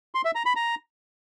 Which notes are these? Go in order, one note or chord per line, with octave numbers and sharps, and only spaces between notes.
C6
E5
A#5
B5
A#5